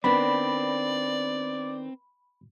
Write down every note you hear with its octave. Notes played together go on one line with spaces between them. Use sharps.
D#3 B3 C4 D4 D5 B5